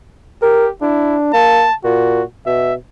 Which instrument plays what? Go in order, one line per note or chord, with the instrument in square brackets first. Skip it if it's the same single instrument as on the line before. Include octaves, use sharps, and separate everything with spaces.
[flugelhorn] G4 [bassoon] A#4
[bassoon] D4 [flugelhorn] E4
[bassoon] A#3 [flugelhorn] A5
[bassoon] A#2 [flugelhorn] F#4
[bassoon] B2 [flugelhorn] E5